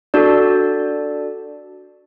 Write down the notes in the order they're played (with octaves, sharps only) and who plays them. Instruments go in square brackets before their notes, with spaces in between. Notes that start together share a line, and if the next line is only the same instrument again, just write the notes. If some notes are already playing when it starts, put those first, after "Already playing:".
[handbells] D4 F#4 A4 D5